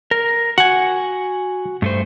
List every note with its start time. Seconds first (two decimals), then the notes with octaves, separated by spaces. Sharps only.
0.11 A#4
0.58 F#4 F#5 G#5
1.82 G2 A3 C5